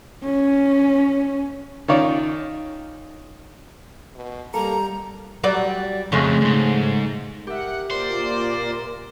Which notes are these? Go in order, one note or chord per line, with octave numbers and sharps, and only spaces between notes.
C#4
D#3 C#4 D#4 F4 C#5 D5
B2
G3 A#3 A4 A#5
F#3 G3 D5
F2 C#3 G#3 A3
D2 G#2
G4 A#4 E5 F#5
A#2 A#4 C5 D5